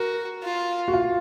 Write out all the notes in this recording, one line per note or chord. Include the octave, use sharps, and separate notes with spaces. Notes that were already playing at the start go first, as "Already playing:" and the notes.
Already playing: F#4 A#4
F4
F#4
F4